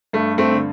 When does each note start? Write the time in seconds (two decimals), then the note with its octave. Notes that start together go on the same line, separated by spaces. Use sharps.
0.13 G2 A3
0.38 A3 C4
0.50 D3